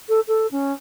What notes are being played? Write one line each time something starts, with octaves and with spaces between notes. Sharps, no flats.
A4
A4
C#4